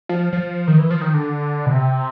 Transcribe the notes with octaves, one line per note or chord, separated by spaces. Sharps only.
F3
F3
D#3
E3
F3
D#3
D3
B2
C3